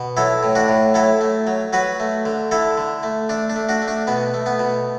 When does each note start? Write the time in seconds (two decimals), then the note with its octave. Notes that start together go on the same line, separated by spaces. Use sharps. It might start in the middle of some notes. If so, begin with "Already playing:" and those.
Already playing: B2
0.17 F#3 E4 A4
0.43 A2
0.55 D4 F#4
0.68 A2
0.94 F#3 E4 A4
1.21 A3
1.47 F#3
1.73 F#3 F#4 B4
2.00 A3
2.25 D3
2.51 D3 E4 A4
2.77 D3
3.03 A3
3.29 A3 D4
3.50 D4
3.56 A3
3.69 D4 F#4
3.82 A3
3.88 D4
4.07 B2 B3
4.34 A3
4.46 B3
4.59 B2